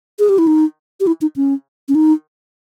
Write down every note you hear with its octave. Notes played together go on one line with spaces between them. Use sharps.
G#4
G4
E4
D#4
G4
E4
D#4
C#4
C#4
D#4